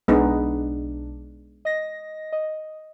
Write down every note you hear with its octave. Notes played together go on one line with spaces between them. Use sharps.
B1 G#3 B3 D4 D#4
D#5 A#6
D#5